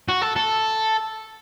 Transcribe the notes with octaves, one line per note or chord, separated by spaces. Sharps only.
F#4
A4
A4